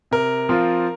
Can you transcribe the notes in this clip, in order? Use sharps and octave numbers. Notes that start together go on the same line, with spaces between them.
C3 A#4
F3 C4 F4